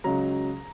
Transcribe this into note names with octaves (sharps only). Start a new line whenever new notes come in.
C#2 C#3 F#3 A#5